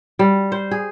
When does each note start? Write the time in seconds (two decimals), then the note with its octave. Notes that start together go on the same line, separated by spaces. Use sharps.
0.19 G3
0.52 C5
0.71 G#4